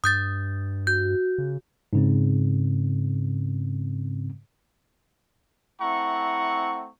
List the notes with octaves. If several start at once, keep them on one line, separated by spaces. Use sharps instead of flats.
G2 D#6 G6 A6
F#4 G6
C#3
G#2 C#3 C4
A3 C4 E4 F#5 A#5 C#6